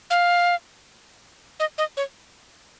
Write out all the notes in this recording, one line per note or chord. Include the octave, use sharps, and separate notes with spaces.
F5
D#5
D#5
C#5